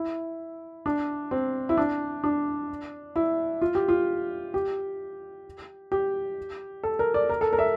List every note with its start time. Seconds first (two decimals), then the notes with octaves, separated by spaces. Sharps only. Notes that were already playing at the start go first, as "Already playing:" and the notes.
Already playing: E4
0.86 D4
1.31 C4
1.69 E4
1.78 D4
2.24 D4
3.16 E4
3.62 F4
3.75 G4
3.88 F4
4.54 G4
5.92 G4
6.83 A4
6.99 A#4
7.14 D5
7.29 A#4
7.41 A4
7.53 A#4
7.59 E5